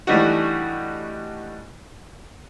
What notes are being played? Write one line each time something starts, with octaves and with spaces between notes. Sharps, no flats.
E3 G3 A3 D4 D#4 F#4